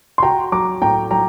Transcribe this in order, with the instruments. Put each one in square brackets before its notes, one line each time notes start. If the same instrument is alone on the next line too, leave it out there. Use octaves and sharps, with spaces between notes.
[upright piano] C6
[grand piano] F#4 [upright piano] G5 A#5
[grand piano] F#3 [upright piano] A#5 D6
[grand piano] A2 [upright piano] G5 A#5
[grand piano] F#3 [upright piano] G5 A#5